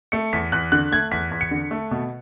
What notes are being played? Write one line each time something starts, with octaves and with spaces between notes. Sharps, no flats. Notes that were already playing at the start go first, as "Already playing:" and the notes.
A3 C#7
E2 B6
E2 F#6
D3 F#6
A3 G#6
E2 B6
E2
C#7
D3
A3
B2